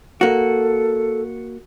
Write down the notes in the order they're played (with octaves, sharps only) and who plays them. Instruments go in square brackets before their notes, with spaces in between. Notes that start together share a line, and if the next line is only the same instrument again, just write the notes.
[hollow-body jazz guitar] A#3 F#4 [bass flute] A4